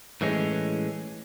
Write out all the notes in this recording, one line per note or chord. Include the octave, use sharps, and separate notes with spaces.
A2 E3 G#3 C#4